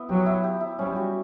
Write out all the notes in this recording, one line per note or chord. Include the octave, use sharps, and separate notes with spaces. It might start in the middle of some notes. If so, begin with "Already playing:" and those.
Already playing: B3 E4
F#3 G4
E4
G4
E4
G3 C#4
F#4